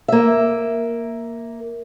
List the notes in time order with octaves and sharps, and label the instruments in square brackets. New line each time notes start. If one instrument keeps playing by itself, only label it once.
[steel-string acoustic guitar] A#3 E5